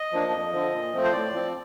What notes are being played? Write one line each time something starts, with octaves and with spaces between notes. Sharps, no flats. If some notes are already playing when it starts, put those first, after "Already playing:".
Already playing: D#5
F3 A#3 D4
F2
D3 F3
A#2
F3 A3 C4
C5
A2 D5
F3 C4